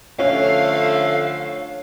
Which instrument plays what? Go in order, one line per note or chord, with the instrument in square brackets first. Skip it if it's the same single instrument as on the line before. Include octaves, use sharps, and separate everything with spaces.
[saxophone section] D3 F3 A3 [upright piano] C#4 [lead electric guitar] F5